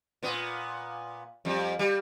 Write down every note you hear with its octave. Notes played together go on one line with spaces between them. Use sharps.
A#2 B3
F2 G3
G3